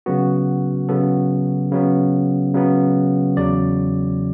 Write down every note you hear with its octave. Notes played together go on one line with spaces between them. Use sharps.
C#3 F#3 B3 F#4
C#3 F#3 B3 A4
C#3 F#3 B3
C#3 F#3 B3
E2 C#3 F#3 D5